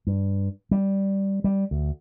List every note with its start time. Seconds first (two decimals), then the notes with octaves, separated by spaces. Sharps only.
0.07 G2
0.71 G3
1.44 G3
1.71 D2